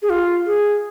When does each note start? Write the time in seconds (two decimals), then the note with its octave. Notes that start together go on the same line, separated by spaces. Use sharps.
0.02 G#4
0.10 F4
0.46 G#4